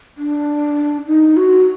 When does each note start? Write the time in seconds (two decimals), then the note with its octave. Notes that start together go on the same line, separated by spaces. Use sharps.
0.18 D4
1.07 D#4
1.37 F#4